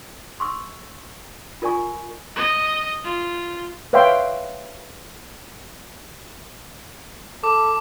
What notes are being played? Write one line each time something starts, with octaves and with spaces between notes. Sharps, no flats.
C6 C#6 E6
F4 A#4 D5 G#5 C#6
D#5
F4
B4 C#5 E5 F5 G5 C6
A4 D6